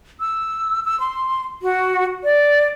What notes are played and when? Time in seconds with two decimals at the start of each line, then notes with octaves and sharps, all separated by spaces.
0.20 E6
0.85 E6
1.00 C6
1.62 F#4
2.24 D5